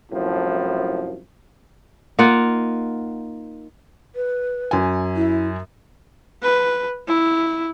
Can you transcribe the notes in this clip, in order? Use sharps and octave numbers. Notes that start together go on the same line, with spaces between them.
C2 F#2 A2 F3
A#3 D#4 F4 F#5
B4
F#2 G#5
E4
B4
E4